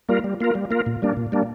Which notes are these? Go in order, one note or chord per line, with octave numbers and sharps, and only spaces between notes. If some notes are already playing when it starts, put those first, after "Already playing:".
G3 A#3 F4 A#4
G3
A#3 F4 A#4
G3
A#3 F4 A#4
A#2
G3 A#3 D4
A#2
G3 A#3 D4